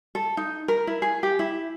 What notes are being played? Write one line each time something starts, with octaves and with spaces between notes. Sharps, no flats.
A4
D#4
A#4
E4
G#4
G4
E4